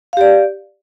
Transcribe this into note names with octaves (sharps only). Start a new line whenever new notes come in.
G4 D5 F5